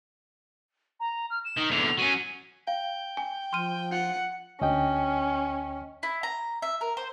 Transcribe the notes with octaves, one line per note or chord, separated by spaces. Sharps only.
A#5
F6
E7
D#3
E2 D3 F7
F#3 C#4 D#7
F5 G5
G#5
F3 C6 F6 D#7
F4 F#5
D2 C#4 D#5 G5
E4
A#5
E5
A#4
C5